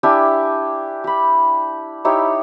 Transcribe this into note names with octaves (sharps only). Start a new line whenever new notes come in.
D4 E4 G4 G#5
G4 B5
D#4 E4 G4 C#5